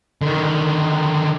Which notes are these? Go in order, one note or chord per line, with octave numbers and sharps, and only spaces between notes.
D3 D#3